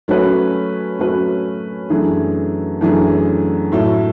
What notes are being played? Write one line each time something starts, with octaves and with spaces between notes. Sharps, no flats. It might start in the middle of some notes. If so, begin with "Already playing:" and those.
F#3 A3 C#4 F#4 B4
F#3 A3 C#4 F#4 B4
F#2 E3 A3 D4 G#4
F#2 E3 A3 D4 G#4
A2 F#3 A3 E4 A4